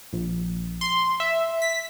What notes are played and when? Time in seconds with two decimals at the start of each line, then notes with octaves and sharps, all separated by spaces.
0.13 A#1
0.81 C6
1.20 E5
1.62 B6